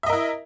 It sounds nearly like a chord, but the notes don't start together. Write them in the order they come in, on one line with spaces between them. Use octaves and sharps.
E5 D#5 A#4 E4